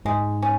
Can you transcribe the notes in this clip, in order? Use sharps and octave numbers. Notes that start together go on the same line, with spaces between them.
G#2 G#3
C#4